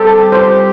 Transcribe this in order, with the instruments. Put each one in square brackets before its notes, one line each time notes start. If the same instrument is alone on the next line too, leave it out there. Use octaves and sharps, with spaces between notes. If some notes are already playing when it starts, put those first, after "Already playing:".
Already playing: [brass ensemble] G3 C4 G4 [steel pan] A4
[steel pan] C5